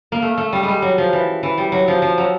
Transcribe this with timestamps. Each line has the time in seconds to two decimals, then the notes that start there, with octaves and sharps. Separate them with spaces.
0.12 A#3
0.22 A3
0.37 A3
0.52 G3
0.63 G#3
0.68 G3
0.82 F#3
0.98 F3
1.13 E3
1.43 E3
1.58 G3
1.72 F#3
1.88 F3
2.02 F3
2.18 F#3